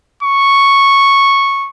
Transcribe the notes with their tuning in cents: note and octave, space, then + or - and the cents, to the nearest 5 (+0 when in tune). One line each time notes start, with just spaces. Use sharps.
C#6 -5